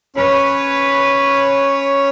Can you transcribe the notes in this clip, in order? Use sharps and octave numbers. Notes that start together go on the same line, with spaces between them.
C#4 B4 C#5